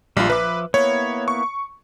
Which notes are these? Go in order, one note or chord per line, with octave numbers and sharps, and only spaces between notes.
A#1 G3 F4
F3 B4 E5 D6
A#3 B3 E4 C#5
C#6